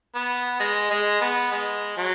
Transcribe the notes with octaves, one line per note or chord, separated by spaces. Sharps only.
B3
G#3
G#3
B3
G#3
F#3